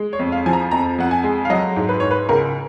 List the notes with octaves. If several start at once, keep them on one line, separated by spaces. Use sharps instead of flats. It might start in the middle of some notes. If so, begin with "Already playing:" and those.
Already playing: G#3
C#5
F2
F5
F3 G#5
A#5
F2 A#5
F2 F#5
G#5
G#3
F5
F#3 D#5
G#2
B4
G#2 C#5
B4
C#2 A#4